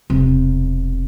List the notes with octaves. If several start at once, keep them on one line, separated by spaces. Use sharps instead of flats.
E1 C3